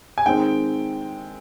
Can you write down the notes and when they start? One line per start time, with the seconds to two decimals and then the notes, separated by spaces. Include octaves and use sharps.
0.18 G#5
0.26 D#3 G#3 C4 G5